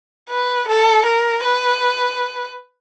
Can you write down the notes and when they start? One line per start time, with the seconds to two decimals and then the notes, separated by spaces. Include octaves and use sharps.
0.29 B4
0.68 A4
1.06 A#4
1.44 B4